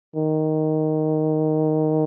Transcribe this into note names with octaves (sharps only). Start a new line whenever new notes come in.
D#3